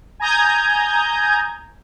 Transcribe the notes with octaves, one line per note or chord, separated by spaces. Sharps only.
G#5 A#5 D#6 G6 G#6